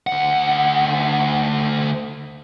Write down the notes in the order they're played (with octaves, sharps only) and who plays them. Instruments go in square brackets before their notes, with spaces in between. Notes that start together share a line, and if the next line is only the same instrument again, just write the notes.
[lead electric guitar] D2 F#5